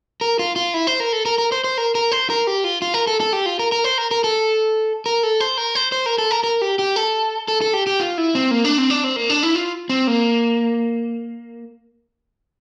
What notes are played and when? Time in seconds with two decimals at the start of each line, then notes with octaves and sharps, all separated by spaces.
0.21 A#4
0.39 F4
0.56 F4
0.74 E4
0.87 C5
1.00 A#4
1.13 A4
1.25 A#4
1.38 A#4
1.52 C5
1.64 C5
1.78 A#4
1.95 A#4
2.12 C5
2.30 A#4
2.47 G4
2.64 F4
2.82 F4
2.94 A#4
3.07 A4
3.20 A4
3.33 G4
3.46 F4
3.59 A#4
3.72 A#4
3.84 C5
3.98 A#4
4.11 A#4
4.24 A4
5.06 A#4
5.23 A4
5.40 C5
5.58 A#4
5.75 C5
5.92 C5
6.06 A#4
6.18 A4
6.31 A#4
6.44 A#4
6.62 G4
6.79 G4
6.96 A4
7.48 A4
7.61 A4
7.74 G4
7.87 G4
8.00 F4
8.18 E4
8.35 C4
8.51 A#3
8.65 D4
8.78 C4
8.90 D4
9.04 C4
9.16 A#3
9.30 D4
9.43 E4
9.55 F4
9.89 C4
10.07 A#3